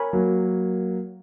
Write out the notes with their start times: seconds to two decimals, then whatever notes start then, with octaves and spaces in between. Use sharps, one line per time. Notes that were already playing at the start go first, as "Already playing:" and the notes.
Already playing: A#4 C#5 G#5 B5
0.13 F#3 A#3